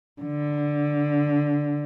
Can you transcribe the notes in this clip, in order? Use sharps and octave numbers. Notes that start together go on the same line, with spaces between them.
D3